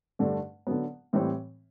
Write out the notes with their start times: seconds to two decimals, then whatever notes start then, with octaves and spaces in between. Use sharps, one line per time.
0.19 G2 D3 A3 D4
0.67 D3 F#3 B3
1.13 A2 E3 G3 C4